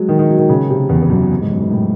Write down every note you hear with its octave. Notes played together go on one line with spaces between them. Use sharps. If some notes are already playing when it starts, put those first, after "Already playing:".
Already playing: F#3 G#3
D#3
D#3
F#3
D#3
C#3
C3
E2
E2
F#2
G#2
F#2
G#2
A2